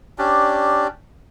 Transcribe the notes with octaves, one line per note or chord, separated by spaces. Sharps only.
C#4 D4 G4 D5